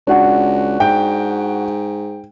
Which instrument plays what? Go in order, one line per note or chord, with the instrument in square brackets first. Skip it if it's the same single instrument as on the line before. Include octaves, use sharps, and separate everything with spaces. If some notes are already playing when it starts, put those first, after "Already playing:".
[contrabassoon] C#2 [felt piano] D4 F#4 F#5
[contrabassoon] G#2 [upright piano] G5